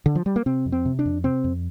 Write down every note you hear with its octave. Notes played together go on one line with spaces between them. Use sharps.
D3
F3
G3
A#3
C3 C4
F2
C4
C3
D4
F2
C3 C4
F2